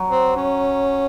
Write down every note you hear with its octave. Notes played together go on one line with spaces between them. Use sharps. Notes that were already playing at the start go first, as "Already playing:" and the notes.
Already playing: F#3
C4
C#4